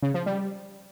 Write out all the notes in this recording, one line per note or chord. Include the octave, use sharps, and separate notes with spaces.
C#3
F3
G3